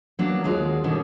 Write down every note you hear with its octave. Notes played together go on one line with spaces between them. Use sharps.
F#3 A#3 B3 D4
D#2 G#3 F4 F#4 A#4 D5
B2 D3 D#3 G3 C#4